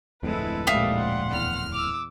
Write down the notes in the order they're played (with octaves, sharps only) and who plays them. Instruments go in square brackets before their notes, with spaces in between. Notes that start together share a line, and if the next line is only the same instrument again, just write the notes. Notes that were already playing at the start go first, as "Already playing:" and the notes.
[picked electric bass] D1 F2 A2 [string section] G#3 E4 [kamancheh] A4 B4
[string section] A#1 G#2 G3 [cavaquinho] E5 F5 D#6
[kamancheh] F#5 C6
[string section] E2 F6
[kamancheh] D6 E6